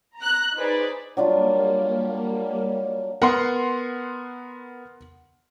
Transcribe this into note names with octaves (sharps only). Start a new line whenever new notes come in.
A#5 F#6
D#4 G#4 B4 C5 D5
F#3 G3 A#3 D4 F4
B3 A#4 F#5 C6